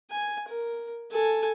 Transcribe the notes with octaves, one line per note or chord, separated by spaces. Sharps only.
G#5
A#4
A4 G#5